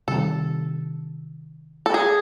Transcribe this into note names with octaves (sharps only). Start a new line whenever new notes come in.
C3 D#3 G3 A4
A4
G#4